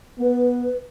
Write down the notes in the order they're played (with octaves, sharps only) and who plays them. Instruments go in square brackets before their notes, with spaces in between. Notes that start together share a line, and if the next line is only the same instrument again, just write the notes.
[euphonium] B3 [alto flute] B4